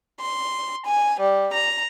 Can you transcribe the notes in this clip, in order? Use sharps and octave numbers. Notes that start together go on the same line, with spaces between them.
C6
G#5
G3
A#5